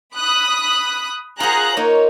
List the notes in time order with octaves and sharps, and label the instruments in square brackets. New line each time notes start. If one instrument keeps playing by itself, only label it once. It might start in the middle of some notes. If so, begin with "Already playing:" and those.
[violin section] B5 D#6 F#6
[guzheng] F4 C5 F#5 [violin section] G#4 A#5 F#6
[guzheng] A#3 D#4 [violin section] C#5